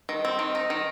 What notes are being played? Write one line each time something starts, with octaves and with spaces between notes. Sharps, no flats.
D#3
C4
D#3
D#4
D#3